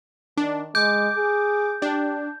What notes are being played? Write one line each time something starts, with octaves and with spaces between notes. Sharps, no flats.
D#3 D4
G#3 D6 G6
G#4
D4 G4